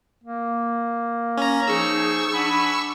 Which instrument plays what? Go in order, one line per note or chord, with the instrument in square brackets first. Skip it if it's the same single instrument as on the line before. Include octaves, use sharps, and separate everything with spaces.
[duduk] A#3
[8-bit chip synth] C#4 A#5
[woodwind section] F3 D#4 G#4 [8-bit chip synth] C#6 E6
[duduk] D4 [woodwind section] F#5 G#5 B5